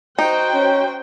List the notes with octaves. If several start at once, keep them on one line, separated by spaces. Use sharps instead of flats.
D#4 F#4 C5 G5
C#4